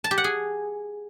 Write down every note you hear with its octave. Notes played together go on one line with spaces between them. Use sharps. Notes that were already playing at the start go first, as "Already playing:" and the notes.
A5
G4
F#5
G#4